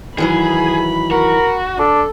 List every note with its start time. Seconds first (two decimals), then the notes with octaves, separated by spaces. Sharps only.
0.18 D#3 E3 F#3 G#4 B5
1.11 F#4 A#4
1.79 D4 A4